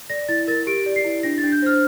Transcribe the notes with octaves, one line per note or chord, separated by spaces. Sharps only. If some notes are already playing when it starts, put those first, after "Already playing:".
D5 A#6
E4 A6
A#4 A6
G4 D7
D5
C7
E4
D4 A#6
A6
D4
G6
C5 F6